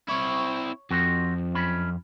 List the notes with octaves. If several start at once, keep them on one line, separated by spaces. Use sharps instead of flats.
C4 E4 C#5
F2 F3 C4 F#4
F#2 C#4 B5